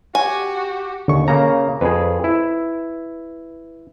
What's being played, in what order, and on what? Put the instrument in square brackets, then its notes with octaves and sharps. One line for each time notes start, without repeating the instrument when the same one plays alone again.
[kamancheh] F#4 G4 [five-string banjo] G#5
[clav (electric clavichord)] D#2 [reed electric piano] D3 C#6
[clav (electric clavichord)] C#3 A#3 [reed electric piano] A#5
[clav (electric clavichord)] F2 G#4 [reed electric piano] B4
[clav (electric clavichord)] E4